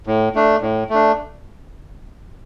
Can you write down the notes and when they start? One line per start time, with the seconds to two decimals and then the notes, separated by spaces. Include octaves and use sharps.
0.07 A2
0.35 A3 D4
0.61 A2
0.90 A3 D4